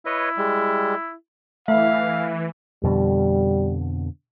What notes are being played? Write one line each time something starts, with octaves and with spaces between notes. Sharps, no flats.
E4 B4 C#5 D#5
G3 G#3
E3 A3 E5 F5
F2 B2 D3 G3